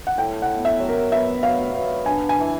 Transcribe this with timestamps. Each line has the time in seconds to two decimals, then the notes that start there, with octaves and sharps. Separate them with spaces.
0.07 F#5
0.18 A2 G5
0.42 F#5
0.49 B3
0.65 E5
0.80 F#3
0.89 A#4
1.12 B3 E5
1.43 F#3 F5
1.74 B3
2.05 D4 G#5
2.29 G#5
2.37 E3